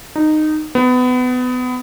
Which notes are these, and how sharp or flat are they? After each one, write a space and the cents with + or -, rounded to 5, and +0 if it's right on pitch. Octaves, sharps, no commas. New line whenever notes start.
D#4 -15
B3 +25